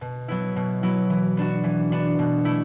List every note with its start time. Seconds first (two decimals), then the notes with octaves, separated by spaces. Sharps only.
0.01 B2
0.28 F#3 B3 E4
0.56 B2
0.83 F#3 B3 E4
1.10 E3
1.37 B3 D4 F#4
1.64 E3
1.92 B3 D4 F#4
2.19 B2
2.45 A3 E4